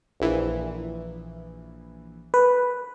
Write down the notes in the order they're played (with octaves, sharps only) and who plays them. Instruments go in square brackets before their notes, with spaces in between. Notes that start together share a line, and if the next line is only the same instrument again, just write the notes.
[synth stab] A#1 E3
[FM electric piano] B4